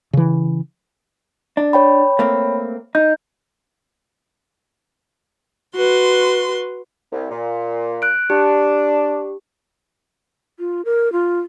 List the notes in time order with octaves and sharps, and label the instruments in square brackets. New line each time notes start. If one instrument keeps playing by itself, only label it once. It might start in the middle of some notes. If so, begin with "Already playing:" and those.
[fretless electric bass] C#3 E3
[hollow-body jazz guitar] D4
[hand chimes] C#5 G5 B5
[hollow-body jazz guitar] A3 A#3 C4
[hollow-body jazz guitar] D#4 [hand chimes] G6
[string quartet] F#4 B4 C6
[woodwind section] C2
A#2
[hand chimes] F#6 D7
[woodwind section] D4 [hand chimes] G4
[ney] F4
A#4
F4